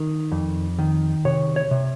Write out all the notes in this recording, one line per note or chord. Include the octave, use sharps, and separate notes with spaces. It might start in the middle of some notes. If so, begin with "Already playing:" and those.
Already playing: D#3
F2
D#3
C3 C#5
C#5
C3